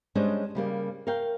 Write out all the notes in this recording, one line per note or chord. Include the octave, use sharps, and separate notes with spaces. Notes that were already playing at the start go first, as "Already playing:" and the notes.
G3 G#3 C#4 D4 C5 D#5
C#3 G3 A#3
A#4 C#5 F5 G5